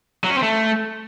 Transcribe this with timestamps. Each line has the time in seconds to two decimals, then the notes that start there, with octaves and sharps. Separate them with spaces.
0.24 F#3
0.31 C#4
0.37 C4
0.43 A3